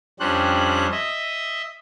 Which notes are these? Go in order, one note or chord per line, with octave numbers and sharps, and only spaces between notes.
F2 G3 C#4 D4 C5 F#6
D#5 E5